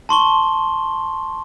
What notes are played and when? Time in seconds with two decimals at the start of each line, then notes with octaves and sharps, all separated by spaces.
0.09 A5 C6 C#6 G7